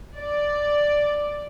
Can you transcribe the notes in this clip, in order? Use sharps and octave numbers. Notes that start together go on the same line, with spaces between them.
D5